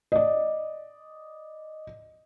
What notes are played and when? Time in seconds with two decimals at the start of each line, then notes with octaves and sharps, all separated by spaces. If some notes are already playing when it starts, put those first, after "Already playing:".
0.12 D5 D#5